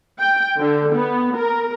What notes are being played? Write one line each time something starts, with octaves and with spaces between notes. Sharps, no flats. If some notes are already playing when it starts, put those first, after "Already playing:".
G5
D3
B3
A#4